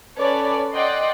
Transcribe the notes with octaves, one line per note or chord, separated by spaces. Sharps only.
C#4 A4 B4 C#5 D5
D5 D#5 F#5 G5 C6